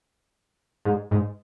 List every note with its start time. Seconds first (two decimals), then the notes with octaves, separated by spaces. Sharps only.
0.85 G#2
1.11 G#2